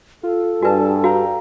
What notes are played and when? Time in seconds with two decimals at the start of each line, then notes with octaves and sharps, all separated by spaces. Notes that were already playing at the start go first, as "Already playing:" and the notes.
0.23 F4 A4
0.62 G2 F#4 B4 G#5 A5
1.04 F#4 F5 G5 A#5